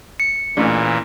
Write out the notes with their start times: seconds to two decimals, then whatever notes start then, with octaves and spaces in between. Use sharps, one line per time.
0.20 C#7
0.57 A1 A#2 E3